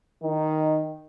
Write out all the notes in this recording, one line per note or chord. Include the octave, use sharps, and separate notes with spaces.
D#3 D#4